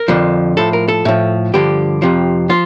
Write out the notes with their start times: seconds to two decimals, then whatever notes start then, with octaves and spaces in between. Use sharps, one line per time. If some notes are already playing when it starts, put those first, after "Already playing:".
Already playing: A#4
0.08 F2 D3 F3
0.57 A2 F3 A4
0.73 A#4
0.88 A4
1.05 A2 F3
1.53 G2 D3 F3 G4
2.02 F2 C3 F3
2.49 F3 F4